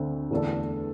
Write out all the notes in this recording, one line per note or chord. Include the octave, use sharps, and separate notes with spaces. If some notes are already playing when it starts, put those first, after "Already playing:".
Already playing: D2 D3 C4
E2 D3 A3 D4 A4